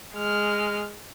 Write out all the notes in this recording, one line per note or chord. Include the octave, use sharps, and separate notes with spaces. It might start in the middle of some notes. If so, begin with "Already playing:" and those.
G#3 F6